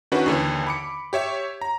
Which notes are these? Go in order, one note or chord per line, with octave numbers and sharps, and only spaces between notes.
D#3 C#4 D4 E4 F#4 B4
D#2 D3 E3
B5 D6 C#7
G4 C#5 E5
A#5